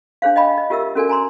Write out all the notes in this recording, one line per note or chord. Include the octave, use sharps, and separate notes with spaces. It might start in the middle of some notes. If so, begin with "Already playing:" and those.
D4 G#4 C5 F5
D#5 F5 G5 B5
D#5
F4 G4 A#4 E5 E6
C#4 F#4 A4 A#4 D5 G#5
G#5 A#5 C6